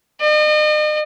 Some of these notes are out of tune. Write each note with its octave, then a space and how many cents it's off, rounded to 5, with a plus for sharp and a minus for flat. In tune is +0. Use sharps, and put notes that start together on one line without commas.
D#5 -40